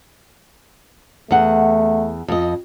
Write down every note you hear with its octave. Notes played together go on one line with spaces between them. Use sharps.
E2 A3 F#5
F2 D#5